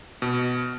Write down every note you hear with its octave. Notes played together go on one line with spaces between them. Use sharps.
B2